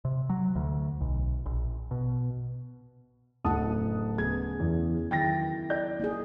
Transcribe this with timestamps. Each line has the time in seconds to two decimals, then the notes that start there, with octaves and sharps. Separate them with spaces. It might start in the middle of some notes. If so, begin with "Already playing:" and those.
0.05 C3
0.30 F#3
0.55 D2
1.01 B1
1.46 A#1
1.91 B2
3.45 D1 C#3 D#4 F#5 A5 D#6
4.18 C#3 B3 G#4 G#6
4.60 E2
5.11 D#3 F#3 E4 G5 A6 A#6
5.70 D5 G6
6.00 A#3 D#4 G#4